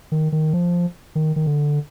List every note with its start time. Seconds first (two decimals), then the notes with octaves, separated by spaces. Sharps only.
0.12 D#3
0.32 D#3
0.53 F3
1.15 D#3
1.36 D#3
1.46 D3